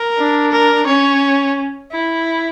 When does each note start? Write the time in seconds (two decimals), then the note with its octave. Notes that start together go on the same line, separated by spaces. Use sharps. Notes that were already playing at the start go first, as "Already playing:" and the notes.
Already playing: A#4
0.18 D4
0.52 A#4
0.86 C#4 C#5
1.92 E4